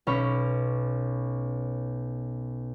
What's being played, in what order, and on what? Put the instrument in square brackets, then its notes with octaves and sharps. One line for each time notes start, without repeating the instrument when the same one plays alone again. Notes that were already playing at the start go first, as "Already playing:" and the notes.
[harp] B1 C#4 C#5 B5 B6